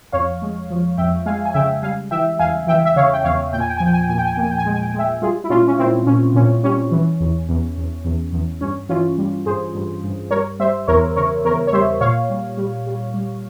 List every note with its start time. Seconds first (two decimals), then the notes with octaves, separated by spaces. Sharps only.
0.12 F2 C#5 F5
0.42 G#3
0.70 F3
0.97 F2 E5 G5
1.26 G#3 F5 G#5
1.45 G#5
1.54 C#3 E5 G5
1.82 G3 F5 G#5
2.11 E3 E5 G5
2.39 E2 F5 G#5
2.67 E3 E5 G5
2.85 E5
2.96 C#3 C#5 F5
3.13 G5
3.24 E2 C#5 F5
3.53 A#2 G5
3.60 G#5
3.69 G5
3.77 F3 G#5
3.86 G5
3.93 G#5
4.01 G5
4.09 A#2 G#5
4.18 G5
4.25 G#5
4.33 G5
4.37 A#2
4.42 G#5
4.50 G5
4.58 G#5
4.65 G#3 G5
4.74 G#5
4.82 G5
4.90 G#5
4.94 G#3 E5 G5
5.22 G3 F4 G#4
5.44 E4
5.50 A#2 C#4 F4
5.67 C#4
5.78 A#2 C4 E4
6.06 A#2 C#4
6.35 A#2 C#4
6.63 G3 C#4
6.91 E3
7.20 E2
7.49 E2
7.77 E2
8.05 E2
8.33 E2
8.61 G2 C#4
8.89 E3 C#4 F4
9.18 G3
9.46 G2 G#4 C5
9.75 G2
10.04 G2
10.31 G3 A#4 C#5
10.60 G3 C5 E5
10.87 E2 A#4 C#5
11.16 C#3 A#4 C#5
11.44 E2 A#4 C#5
11.67 C#5
11.73 G3 C5 E5
12.00 A#2 C#5 F5
12.30 G3
12.57 G3
12.86 G3
13.14 G3